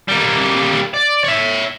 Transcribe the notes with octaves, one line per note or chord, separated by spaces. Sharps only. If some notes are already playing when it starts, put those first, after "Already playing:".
G3 A#3
D5
C#5 E5